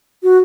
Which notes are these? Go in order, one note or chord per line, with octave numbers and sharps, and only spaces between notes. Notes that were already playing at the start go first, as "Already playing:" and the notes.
F#4